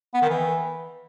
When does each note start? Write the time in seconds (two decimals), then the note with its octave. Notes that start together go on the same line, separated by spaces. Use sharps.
0.14 B3
0.22 D#3
0.30 E3